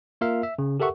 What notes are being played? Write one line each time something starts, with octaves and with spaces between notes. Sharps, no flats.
A#3 F4 A#4 E5 F5
E5
C#3
G4 A4 A#4 E5 F#5 C#6